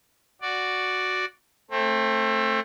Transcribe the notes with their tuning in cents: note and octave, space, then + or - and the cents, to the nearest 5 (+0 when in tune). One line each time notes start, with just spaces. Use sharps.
F#4 +0 D5 +0
A3 +15 C4 +30